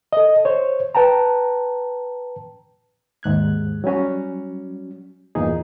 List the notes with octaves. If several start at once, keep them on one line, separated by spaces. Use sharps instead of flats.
A4 D#5
C5 C#5
B4 G5 A5 A#5
D#2 G#2 F#6 G#6
F#3 G3 C#4 F#4
E2 G2 A#2 D#4 G#4